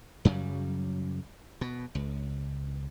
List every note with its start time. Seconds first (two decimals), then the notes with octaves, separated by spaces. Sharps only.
0.25 F#2 C#3 F#3 G3
1.61 B2
1.95 C#2